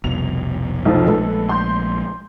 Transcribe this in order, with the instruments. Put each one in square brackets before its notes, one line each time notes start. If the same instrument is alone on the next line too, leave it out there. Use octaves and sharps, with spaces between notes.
[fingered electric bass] F1 C2 B2 [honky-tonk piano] F7
[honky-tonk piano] B1 F3
[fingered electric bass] A#1 G#3 A3 [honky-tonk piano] A4 B4
[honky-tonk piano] C6 G6